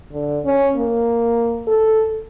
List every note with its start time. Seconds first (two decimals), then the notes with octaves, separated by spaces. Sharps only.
0.12 D3
0.45 C#4
0.76 A#3
1.67 A4